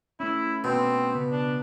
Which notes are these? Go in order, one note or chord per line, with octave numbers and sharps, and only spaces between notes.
A3 C#4 E4
B2 C4
C#3 B3 B4
D4